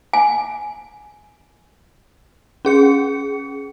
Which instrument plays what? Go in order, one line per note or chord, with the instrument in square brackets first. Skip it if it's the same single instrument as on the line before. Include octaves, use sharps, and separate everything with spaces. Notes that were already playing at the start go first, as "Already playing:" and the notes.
[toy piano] G#5
[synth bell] C#4 G#4 C#7